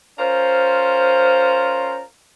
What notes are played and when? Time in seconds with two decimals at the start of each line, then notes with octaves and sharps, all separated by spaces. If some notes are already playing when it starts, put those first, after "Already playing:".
0.19 C#4 F4 A#4 C5